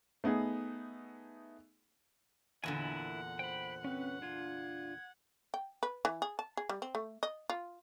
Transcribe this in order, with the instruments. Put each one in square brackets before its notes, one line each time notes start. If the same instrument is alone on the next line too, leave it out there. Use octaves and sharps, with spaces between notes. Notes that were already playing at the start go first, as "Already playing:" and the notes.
[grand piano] A3 B3 D#4 G#4
[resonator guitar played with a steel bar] E2 A#2 D3 [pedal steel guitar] E4 A#4 G#5 [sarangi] F#5
[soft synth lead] C5 [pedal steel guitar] G5 B5
[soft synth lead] C4 [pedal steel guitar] C#4 B4
[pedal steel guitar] D4 F4 [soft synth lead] G#6
[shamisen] G5
B4
E3
G#4
A5
G#4
G3
C4
A3
D#5
F4